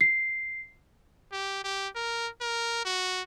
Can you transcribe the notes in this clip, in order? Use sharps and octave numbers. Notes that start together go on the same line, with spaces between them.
C7
G4
G4
A#4
A#4
F#4